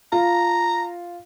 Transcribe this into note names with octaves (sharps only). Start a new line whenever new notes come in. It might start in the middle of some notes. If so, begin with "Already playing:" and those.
F4 A#5